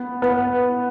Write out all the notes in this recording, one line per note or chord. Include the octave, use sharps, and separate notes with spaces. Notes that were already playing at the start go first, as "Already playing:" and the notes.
Already playing: B3
B3